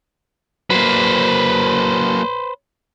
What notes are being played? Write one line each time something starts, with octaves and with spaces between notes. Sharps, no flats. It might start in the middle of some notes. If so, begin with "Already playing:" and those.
F#3 A#3 B4 C5